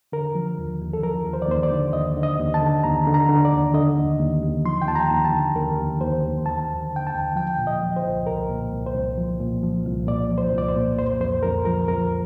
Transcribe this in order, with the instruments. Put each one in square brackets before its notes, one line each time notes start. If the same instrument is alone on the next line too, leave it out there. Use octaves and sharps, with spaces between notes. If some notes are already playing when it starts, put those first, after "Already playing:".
[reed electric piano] D3 A#4
F3
D#2
D#2
A4
F3 A#4
D#2
C5
D5
D#2 C5
D5
D3
D#2 D#5
D3
D#5
D#2
A5
D3
D#2 A#5
D3
A#5
D3
D5
D#2
D3 D#5
D#2
D#2
D#2
F3 C6
G5
D#2 A5
A#5
D#2
A5
D3
D#2 A#4
D#2
D#2 C5
D#2
D#2 A5
D#2
D3
G5
A5
D#2
F3 G5
A#2
D#5
F3
C5
C2
C2 A#4
A#2
C2
C5
C2
F3
A#2
F3
C2
A#2 D5
F3
C5
C2 D5
C5
A#2
F2 C5
F2 C5
F2 A#4
F3 A#4
F2 A#4